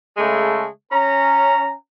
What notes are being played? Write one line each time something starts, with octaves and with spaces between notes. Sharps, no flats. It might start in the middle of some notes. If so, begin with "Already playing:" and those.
C#3 G#3 A3
C#4 A#5